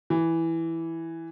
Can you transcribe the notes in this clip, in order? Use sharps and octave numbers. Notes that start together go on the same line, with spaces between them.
E3